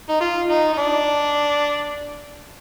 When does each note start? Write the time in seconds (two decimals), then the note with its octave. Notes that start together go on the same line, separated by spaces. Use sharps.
0.09 D#4
0.20 F4
0.50 D#4
0.73 D#4
0.77 D4